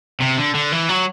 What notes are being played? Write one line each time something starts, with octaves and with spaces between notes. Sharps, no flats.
C3
D3
D3
E3
F#3